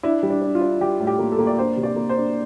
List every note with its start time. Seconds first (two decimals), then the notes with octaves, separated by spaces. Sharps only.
0.03 D4 E4
0.23 G3
0.30 D4
0.42 D4
0.55 F4
0.61 D4
0.81 G3 G4
1.00 A2
1.07 G4
1.19 A#3
1.32 A4
1.39 A#3
1.47 D5
1.58 D4 C5
1.77 C3
1.83 D5
1.96 A#3
2.09 C5
2.16 D4